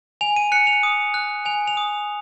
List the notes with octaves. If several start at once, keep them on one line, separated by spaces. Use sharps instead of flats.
G#5 F7
D#7
F#6 C#7
F7
D#6
F#6
G#5 F7
F7
D#6